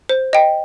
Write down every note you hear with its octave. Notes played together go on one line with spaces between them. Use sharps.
C5
D#5 G5